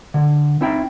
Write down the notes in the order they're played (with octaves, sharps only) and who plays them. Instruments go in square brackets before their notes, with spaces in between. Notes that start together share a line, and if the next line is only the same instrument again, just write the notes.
[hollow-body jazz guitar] D3
C4 D#4 E4 E5 G5